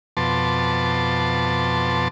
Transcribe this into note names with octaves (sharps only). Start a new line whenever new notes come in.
F2 B2 A5 C6 D6